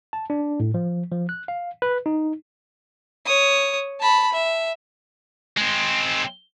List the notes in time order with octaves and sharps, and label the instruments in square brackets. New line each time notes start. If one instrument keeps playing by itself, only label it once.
[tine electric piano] A5
D4
A2
F3
F3
F#6
F5
B4
D#4
[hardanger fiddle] C#5 D#6
A5 B5
E5
[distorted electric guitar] G#3 C4